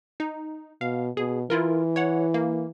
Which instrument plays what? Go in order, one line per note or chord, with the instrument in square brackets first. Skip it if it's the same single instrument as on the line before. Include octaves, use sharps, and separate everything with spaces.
[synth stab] D#4
[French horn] B2 [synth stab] F5
[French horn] B2 [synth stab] G#4
[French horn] E3 [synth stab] E4 F4 A#4
[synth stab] C#5 F#5
A#3